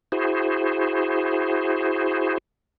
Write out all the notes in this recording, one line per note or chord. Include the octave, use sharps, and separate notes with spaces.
E4 F#4 G#4 C5